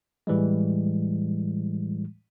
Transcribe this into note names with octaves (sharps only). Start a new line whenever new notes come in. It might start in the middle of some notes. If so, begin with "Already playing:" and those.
A2 E3 G3 G#3